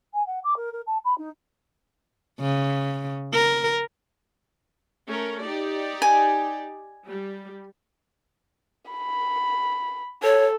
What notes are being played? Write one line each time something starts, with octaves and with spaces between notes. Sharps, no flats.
G#5
F#5
D6
A#4
A#4
A5
B5
D#4
C#3
A#4
A3 C#4 A#4
D#4 G4 D5
G#5
G3
B5
A4 C#5